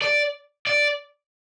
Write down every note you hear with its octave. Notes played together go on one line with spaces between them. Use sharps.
D5
D5